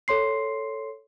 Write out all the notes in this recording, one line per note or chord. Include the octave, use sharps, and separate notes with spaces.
A4 C#5 C6 C7